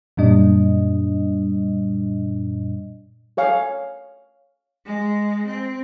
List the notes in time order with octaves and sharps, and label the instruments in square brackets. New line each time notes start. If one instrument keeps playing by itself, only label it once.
[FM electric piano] F#2 A#2 G3 D4 D#5
[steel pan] A4 C#5 F5 G#5
[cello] G#3
C4